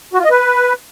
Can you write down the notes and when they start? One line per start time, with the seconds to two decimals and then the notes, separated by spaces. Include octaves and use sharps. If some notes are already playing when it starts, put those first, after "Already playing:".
0.13 F#4
0.19 F4
0.24 D#5
0.30 B4